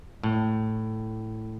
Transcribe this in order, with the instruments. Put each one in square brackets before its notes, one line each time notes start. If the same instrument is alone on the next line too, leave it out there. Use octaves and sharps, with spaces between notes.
[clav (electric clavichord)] A2